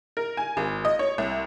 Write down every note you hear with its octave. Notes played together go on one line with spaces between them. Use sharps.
A#4
G#5
G#1
D#5
C#5
C2